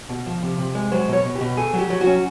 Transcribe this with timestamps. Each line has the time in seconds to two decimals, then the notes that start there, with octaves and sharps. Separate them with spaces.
0.09 B2
0.26 F3
0.43 C3
0.58 C3
0.75 G#3
0.92 F#3 C5
1.08 B2 C#5
1.25 B2
1.36 G4
1.41 B2
1.57 A3 G#4
1.73 F#3 G4
1.90 F#3
2.01 F#4
2.06 C#4